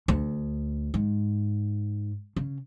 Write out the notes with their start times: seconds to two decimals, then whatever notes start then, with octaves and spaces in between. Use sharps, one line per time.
0.08 D2
0.94 G#2
2.36 C#3